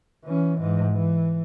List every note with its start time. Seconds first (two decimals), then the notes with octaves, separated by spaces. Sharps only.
0.24 E3 C#4
0.59 G#2 E3
0.92 E3